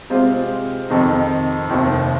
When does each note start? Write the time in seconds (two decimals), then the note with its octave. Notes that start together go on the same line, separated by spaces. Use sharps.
0.10 C3 G#3 C4 F4 C5
0.89 F2 D#3 C4 D#4
1.69 F1 D#2 D#3 C4